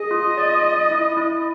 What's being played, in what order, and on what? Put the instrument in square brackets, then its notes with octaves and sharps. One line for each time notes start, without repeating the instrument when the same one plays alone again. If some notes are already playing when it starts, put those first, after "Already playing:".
Already playing: [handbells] G#4 [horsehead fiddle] D#5
[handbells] F4
D5
D5
E4
E4